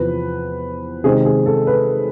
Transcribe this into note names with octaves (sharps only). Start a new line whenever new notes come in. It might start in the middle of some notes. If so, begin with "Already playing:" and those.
Already playing: E2 C3 F3 B4
C3 D#3 G#3 C4 D#4 G#4
G#4
A4
B4